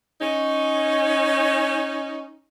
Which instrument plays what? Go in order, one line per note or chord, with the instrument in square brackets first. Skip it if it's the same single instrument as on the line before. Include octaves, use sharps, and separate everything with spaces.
[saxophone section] C#4 D#4